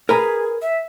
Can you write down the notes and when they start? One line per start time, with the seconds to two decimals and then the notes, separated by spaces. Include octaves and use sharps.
0.09 G#4 A#4 B4 A#5
0.62 E5